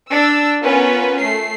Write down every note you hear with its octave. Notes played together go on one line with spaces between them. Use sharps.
D4 E6
B3 C#4 F4 A#4 B4
A3 C7